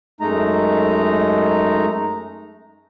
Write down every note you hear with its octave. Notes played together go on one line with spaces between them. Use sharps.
F#2 G#3 A3 D#4 A#5